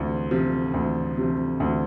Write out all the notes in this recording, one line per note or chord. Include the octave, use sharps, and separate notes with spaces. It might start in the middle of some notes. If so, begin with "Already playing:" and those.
Already playing: D2 C3 F3
C3 F3
D2
C3 F3
D2